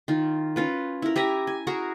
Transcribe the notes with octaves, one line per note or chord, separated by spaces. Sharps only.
D#3 F4
C#4 F4 B4
E4 A#4
G4 E5 G#5 A#5
G#5
F#4 G#4 A#4